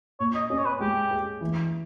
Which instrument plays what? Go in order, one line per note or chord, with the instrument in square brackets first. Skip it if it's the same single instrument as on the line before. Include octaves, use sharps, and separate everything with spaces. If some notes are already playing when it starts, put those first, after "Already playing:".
[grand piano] A#2 [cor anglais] C#5
[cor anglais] D#5
[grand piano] C#4 [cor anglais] D#5
[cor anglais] C#5
B4
[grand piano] G#3 [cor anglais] G4
[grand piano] G#4
E3